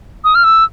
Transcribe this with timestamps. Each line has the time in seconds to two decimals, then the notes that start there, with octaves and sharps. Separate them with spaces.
0.24 D#6
0.35 F6
0.44 E6